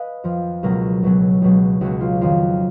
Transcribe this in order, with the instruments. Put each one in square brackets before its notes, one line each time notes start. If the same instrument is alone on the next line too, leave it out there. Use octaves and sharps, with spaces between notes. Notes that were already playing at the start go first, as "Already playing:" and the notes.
Already playing: [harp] B4 D#5 F5
F2 F3
C#2 B2 F#3 A#4
C#2 B2 F#3
C#2 B2 F#3
C#2 B2 F#3 F#4
F4
F2 D#3 F#3 F4